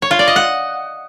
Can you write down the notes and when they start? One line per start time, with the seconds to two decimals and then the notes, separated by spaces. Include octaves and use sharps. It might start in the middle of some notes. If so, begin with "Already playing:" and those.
0.02 C#5
0.11 F4
0.19 D5
0.28 D#5
0.36 F#5